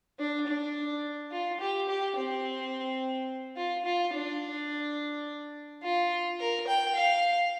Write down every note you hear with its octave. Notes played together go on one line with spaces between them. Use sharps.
D4
D4
F4
G4
G4
C4
F4
F4
D4
F4
A#4
G5
F5